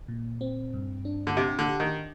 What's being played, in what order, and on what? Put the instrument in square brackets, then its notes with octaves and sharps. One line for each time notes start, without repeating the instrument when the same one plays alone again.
[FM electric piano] A#2
C4
G2
D4
[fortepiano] D3
[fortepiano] C3 [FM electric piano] G4
[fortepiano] D3
[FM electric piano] G4
[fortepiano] D#3